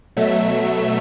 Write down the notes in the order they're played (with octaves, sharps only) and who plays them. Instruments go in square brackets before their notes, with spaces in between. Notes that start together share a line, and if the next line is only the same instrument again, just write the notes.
[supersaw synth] B2 F#3 A3 E5